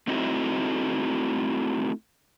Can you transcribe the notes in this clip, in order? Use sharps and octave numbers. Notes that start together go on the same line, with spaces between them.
A3 C4 D#4 E4 F#4